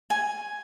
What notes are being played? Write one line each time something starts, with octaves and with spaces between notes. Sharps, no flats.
G#5